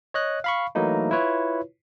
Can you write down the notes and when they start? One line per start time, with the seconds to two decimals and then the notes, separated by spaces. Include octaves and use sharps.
0.14 C#5 D#5 F#6
0.44 F5 B5 C#6
0.75 E3 F#3 A3 A#3 D#4 E4
1.11 E4 F4 B4 C#5